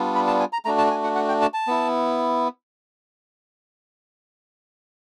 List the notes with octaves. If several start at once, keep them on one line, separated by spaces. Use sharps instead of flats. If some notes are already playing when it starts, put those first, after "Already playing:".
Already playing: G3 B3 D4 F4
B5
A5
G#5
A#5
A3 D4 F#4 A#5
A5
G#5
F#5
F#5
G5
A5
A5
B3 E4